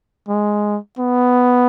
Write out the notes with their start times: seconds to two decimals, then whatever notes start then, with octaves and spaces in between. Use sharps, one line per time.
0.29 G#3
0.99 B3